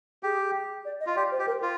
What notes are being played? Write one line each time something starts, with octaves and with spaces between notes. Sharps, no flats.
G4 G#4
D5
D#5
F4
G4 D5
C5
G4
A#4
F4